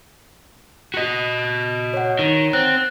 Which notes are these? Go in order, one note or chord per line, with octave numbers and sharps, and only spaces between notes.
F#4 D#5
C#5 F#5
D#3
C4 F#6 A6